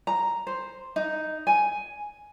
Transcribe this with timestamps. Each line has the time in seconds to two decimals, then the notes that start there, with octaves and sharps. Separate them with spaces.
0.07 A#5
0.47 C5
0.96 D#4
1.47 G#5